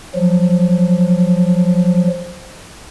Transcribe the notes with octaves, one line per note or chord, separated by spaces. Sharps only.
F3 F#3